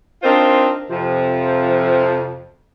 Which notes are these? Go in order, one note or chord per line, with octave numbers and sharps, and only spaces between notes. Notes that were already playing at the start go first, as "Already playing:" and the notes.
C4 D4 D#4 F4 A#4 C5
F2 C3 F3